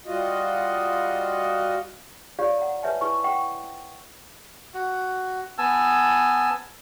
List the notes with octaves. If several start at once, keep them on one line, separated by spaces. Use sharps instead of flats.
G3 F4 F#4 D#5
F4 G4 C#5 D5 F5
F#5 A#5
B4 C#5 E5 G#5 A5
E4 B4 G#5 A5 C#6
F#5 G5 C#6
F#4
B3 G#5 A5 E6